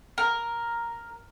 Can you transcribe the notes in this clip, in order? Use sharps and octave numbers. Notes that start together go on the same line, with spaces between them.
A#4